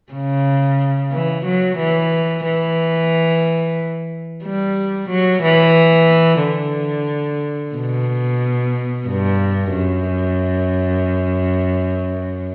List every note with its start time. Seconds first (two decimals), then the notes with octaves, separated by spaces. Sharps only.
0.13 C#3
1.12 E3
1.46 F#3
1.78 E3
2.45 E3
4.45 G3
5.10 F#3
5.43 E3
6.43 D3
7.76 B2
9.08 G2
9.75 F#2